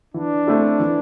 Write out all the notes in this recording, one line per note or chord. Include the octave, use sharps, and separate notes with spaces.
E3 D4
A3 C4 E4 A4
E3